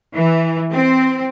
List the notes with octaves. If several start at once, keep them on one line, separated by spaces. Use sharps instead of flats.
E3
C4